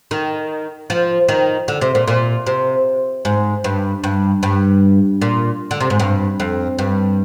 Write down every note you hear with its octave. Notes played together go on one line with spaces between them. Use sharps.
D#3
F3
D#3
D3
C3
A#2
A#2
C3
G#2
G2
G2
G2
A#2
D3
C3
G#2
G2
F2
G2